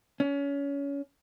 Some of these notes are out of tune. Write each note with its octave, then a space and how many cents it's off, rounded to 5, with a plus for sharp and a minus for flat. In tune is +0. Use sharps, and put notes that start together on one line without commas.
C#4 +25